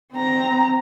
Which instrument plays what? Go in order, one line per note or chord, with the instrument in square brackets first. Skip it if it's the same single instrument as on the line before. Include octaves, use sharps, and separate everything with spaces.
[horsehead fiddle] C4 A#5